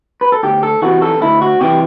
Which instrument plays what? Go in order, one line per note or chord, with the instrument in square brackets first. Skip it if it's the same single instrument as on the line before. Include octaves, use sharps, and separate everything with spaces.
[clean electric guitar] B4
A4
D2 G4
A4
C3 E3 F#4
A4
D2 E4
F#4
C3 E3 G4